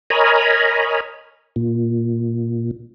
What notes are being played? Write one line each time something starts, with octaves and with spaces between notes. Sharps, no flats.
A#4 C#5 D#5 G#5 A#5 B5
A#2